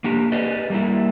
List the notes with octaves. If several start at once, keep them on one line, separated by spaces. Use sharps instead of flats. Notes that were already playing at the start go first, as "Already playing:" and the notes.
A#3 D4 G4
G4 G#4 B4 D5 D#5
G3 A#3 E4